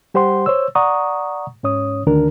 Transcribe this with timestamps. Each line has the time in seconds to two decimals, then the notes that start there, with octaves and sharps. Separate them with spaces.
0.14 G3 G4 C5 F#5 C6
0.46 C5 C#5 E6
0.75 D5 F#5 A#5 C#6 D#6
1.63 G#2 C#4 C#5 D#6
2.07 D2 D#3 D4 A#4